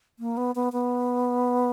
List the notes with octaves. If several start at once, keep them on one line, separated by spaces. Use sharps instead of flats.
A#3
B3
B3
B3